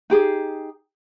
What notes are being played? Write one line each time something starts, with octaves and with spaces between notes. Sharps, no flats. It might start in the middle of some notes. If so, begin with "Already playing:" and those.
D#4 G4 G#4